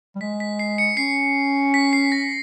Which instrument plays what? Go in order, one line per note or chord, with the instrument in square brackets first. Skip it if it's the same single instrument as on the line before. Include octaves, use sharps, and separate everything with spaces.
[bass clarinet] G3
[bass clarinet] G#3 [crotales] B6
[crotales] B6
C7
C#7
[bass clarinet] C#4 [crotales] C7
[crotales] B6
C7
A#6